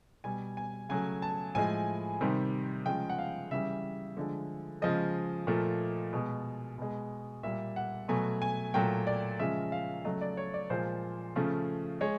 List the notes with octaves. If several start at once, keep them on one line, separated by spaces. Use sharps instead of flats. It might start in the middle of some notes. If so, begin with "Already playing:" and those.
B2 G3 G#5
G#5
C#3 F#3 A3 G#5
A5
A2 F3 G#3 G#5
C3 D#3 G3
C#3 F3 G#3 G5
F#5
F5
C#3 E3 G3 E5
D3 F3 G#3
C#3 F3 G#3 D#5
A#2 F3 A3
B2 G#3
B2 G#3
A#2 G3 E5
F#5
B2 F#3 A3 G#5
G#5
A#2 F#3 A3 G5
D5
C#3 F3 G#3 E5
F5
C#3 F#3 A3 D#5
D5
C#5
D5
A#2 F3 G#3 C5
C#3 F3 A3
G#3 C#5